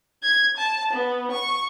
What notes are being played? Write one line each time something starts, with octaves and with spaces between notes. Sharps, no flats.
G#6
A5
B3
C#6